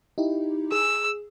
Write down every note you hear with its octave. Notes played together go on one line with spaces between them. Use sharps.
D#4 E4 G4
G#4 E6